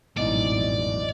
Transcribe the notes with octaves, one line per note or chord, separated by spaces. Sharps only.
A1 F2 G#2 B2 E3 F#3 D5 D#5